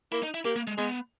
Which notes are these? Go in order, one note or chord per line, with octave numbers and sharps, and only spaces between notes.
A#3 E4
D#4
E4
A#3 G4
A#3
G#3
G#3 B3